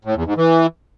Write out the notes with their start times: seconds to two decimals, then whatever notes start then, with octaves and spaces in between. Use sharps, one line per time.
0.05 A2
0.15 E2
0.26 G#2
0.37 E3